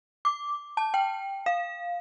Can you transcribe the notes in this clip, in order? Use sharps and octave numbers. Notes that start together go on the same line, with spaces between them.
D6
A5
G5
F5